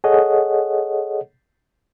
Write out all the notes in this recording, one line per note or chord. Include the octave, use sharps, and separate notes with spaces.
G#4 A4 C#5 D#5 F#5